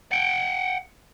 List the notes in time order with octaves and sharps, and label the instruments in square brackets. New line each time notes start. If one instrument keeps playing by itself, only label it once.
[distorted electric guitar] F#5 G5